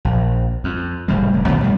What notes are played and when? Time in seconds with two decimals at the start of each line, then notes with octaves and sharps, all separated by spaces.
0.05 A#1
0.64 F2
1.08 F#1 A2 G3 G#3
1.34 F1
1.48 F2 B2 D#3 A3
1.62 G2 F3 G3